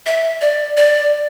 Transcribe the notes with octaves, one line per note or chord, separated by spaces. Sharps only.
E5
D5
D5